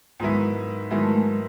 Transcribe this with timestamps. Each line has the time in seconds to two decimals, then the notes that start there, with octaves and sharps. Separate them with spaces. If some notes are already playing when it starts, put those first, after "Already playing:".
0.20 G#2 D#3 F#3 G#3 B3 E4
0.90 G#2 D#3 F#3 G#3 B3 E4
1.03 A3
1.14 G#3